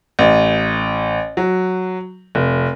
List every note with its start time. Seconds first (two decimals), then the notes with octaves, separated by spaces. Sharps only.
0.19 A1
1.37 F#3
2.35 F1